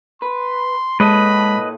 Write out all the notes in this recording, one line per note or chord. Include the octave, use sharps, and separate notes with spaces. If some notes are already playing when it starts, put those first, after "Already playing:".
B4 C6
A#2 G#3 A4 B4 C#5 D#5 B5